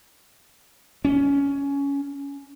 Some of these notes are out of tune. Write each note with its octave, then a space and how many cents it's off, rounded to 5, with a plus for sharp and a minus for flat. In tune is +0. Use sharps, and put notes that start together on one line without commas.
C#4 +15